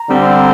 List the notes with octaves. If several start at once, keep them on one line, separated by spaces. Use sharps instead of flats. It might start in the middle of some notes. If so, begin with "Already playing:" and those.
Already playing: A#5
D3 G3 C4